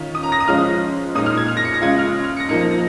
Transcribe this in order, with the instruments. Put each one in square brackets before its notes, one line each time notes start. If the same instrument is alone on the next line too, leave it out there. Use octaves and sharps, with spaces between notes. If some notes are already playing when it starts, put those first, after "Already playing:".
Already playing: [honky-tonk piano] D#3 C#4 F4
[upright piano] D#6
A#5
A#6
D#6
[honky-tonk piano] F3 G#3 C#4 F4 [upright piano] F6
[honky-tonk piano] A#2 G#3 D#4 [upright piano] D#6
[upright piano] F6
G#6
F6
A#6
C#7
A#6
[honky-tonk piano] C#3 G#3 F4 [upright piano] G#6
[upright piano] F6
F6
C#7
A#6
[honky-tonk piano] F3 A#3 D#4 [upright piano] C#7
[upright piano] A#6
A#6